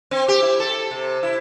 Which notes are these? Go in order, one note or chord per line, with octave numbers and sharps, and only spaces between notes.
C4
G4
E4
A4
C3
E4